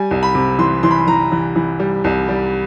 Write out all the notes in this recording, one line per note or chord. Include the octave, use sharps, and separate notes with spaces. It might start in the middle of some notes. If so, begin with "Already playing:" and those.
Already playing: G3 G#5
C2
B5
C3
E3 C6
E3 C6
B5
C6
E3 A#5
E3
E3
G3
C2
G3